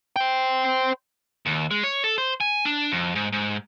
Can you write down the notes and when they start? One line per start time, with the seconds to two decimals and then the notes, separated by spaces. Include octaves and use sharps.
0.16 C5 G5
1.46 D#2
1.71 G#3
1.83 C#5
2.04 A4
2.18 C5
2.41 G#5
2.65 D4
2.92 F2
3.16 G#2
3.33 G#2